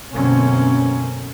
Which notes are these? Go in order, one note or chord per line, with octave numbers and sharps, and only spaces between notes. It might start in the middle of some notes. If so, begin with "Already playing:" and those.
F#2 B2 D3 A#3 C4 C#4